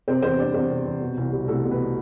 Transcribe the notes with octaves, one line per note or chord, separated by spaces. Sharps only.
C3 C4 C5
E2 C4 C5
G3 D4 D5
E2 C4 C5
C3
E2
B2
C2
G3
C2 A3 A4
B2
B3 B4